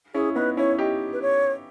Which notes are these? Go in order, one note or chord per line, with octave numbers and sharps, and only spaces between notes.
C#4 E4 G#4
B3 D#4 B4
C#4 E4 C#5
D#4 G4
B4
C#5